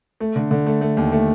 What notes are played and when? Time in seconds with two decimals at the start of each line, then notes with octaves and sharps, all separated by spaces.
0.20 A3
0.36 D3
0.51 D3
0.66 A3
0.81 A3
0.97 D#2
1.12 A3